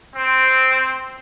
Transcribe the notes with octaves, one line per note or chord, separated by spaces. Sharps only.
C4